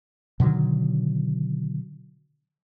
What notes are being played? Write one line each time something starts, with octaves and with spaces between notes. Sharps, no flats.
B2 D3 D#3 F#3